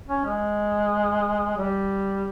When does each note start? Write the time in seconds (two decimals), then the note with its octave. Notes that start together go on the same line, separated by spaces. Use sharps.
0.08 C#4
0.25 G#3
1.57 G3